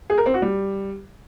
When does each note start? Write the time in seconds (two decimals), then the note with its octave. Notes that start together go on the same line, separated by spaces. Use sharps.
0.10 G#4
0.18 A#4
0.26 C4
0.34 F#4
0.42 G3